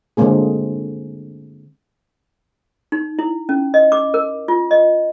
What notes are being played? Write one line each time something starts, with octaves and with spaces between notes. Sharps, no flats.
D3 F#3 G#3 A#3 C4 G#4
D#4
E4
C#4
D#5
D6
A#4
F4
D#5